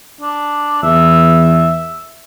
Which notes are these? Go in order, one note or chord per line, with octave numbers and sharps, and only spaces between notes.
D4
E2 E5